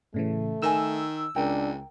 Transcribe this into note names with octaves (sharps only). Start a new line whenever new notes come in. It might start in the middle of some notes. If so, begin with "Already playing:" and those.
A2 C#3 E3 A3
D#3 A#4 G#5 E6
C#2 D4 A#4 G5 A#5